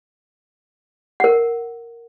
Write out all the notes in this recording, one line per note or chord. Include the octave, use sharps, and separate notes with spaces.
A#4 F#5